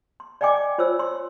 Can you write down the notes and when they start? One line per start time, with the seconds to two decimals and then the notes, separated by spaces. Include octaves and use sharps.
0.20 C6
0.41 D5 D#5 G5 G#5 D6
0.78 F4 C5 C#5 E6
0.99 C6